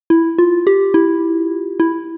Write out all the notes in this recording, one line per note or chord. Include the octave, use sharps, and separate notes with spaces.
E4
F4
G4
E4
E4